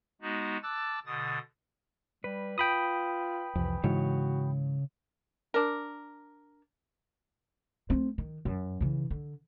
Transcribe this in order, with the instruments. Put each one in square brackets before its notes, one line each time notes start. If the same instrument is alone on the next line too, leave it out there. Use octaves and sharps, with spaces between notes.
[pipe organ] G#3 B3 D#4 F#4
A5 D6 E6 F#6 A6
B2 D3 D#6 A6
[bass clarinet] G3 [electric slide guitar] B4
[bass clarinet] F4 [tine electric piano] G5 B5 D#6
[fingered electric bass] C2 F2 [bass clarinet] E3
[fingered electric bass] G#2 E3 [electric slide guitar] C#3 C#5 [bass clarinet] F#4
[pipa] D4 A#4
[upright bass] A3 C4
D#3
F#2
C#3 E3
D3